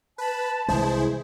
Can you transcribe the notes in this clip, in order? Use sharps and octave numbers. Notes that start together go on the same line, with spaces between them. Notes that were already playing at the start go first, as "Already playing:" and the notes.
B4 A5 B5
C2 E3 G#3 E4 G#4 C5